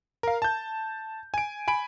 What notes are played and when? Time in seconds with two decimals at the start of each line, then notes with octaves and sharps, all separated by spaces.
0.23 A#4 F5
0.42 A5 G6
1.34 G#5 D7
1.68 G#5 B5 D7